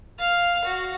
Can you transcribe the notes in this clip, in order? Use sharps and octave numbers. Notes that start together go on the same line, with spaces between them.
F5 F6
F#4